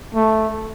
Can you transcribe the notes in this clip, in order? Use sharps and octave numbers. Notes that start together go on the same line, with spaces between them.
A3